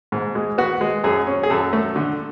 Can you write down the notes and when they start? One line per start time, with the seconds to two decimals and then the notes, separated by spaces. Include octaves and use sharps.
0.12 G#2
0.35 G#3
0.58 B3 F#4
0.81 G#3
1.04 F#2 G#4
1.27 C#4
1.43 G#4
1.50 F#2 A4
1.73 A3
1.96 D3